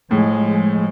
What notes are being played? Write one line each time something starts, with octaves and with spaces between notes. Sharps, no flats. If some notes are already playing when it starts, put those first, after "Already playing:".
A2 F3 G#3